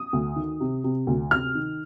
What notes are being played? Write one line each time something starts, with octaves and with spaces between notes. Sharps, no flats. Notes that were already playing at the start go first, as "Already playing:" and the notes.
Already playing: D#6
D2
D#3
C3
C3
D2
C3 F6
D#3